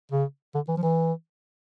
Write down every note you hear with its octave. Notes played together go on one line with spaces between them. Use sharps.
C#3
D3
E3
F3
E3